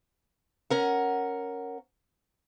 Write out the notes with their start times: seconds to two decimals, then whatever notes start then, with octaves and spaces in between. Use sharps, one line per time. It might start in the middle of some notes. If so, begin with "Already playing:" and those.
0.70 C#4 A#4 F#5